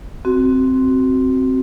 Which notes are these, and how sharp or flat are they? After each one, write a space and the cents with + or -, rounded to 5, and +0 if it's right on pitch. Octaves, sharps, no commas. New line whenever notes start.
C4 +0 F#4 +10